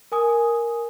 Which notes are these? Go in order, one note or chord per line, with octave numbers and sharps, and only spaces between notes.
A#4 G#5 D#6